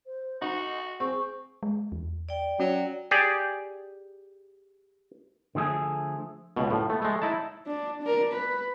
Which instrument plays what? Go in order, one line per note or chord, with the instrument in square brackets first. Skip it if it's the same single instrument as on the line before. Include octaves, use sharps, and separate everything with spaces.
[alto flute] C5
[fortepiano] D#4 [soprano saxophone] F#4 [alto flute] D#5
[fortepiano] C4 [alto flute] G#4 [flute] C#6
[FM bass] G#3
E2
[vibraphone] D5 G5
[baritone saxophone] F#3 [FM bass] C#4
[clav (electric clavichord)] G4 G#4 D5
[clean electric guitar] D3 F3 A3 G#4
[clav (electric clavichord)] C#2 B2
A2 F3
A3 B3
G#3 A3
D#4 E4 A5
[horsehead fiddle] D4
D4 A#4
B4